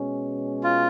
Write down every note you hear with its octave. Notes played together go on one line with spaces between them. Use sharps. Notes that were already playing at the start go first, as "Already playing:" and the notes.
Already playing: B2 G#3 C#4
F4